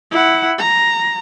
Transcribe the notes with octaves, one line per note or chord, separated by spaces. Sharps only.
E4 F#5
A#5